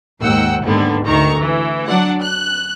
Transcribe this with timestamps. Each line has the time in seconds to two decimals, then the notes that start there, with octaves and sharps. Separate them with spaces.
0.21 D#2 G#2 F#5 G5 E6
0.65 D#2 G#2 D3 G3 B3
1.06 D2 D#3 A#5 C#6
1.41 E3
1.87 F#3 D4 D5 F#5
2.21 F#6